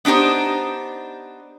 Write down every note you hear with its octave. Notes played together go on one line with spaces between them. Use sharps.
B3 D4 D#4 G4 C5